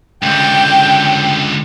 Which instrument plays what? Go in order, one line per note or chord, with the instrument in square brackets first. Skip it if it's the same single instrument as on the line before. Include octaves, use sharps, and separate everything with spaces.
[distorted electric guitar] C#2 D3 [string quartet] G5